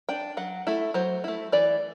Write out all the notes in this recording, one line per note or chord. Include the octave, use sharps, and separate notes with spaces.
D4 G5
F#3 F#5
A3 E4
F#3 C5
A3 E4
E3 D5